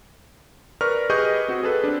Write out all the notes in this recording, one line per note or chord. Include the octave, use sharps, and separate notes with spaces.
A#4 B4 D5 C#6 F6
G4 G#4 B4 D#5 C#6 G6
C4 F#4
G#4 A4 B4
C4 D4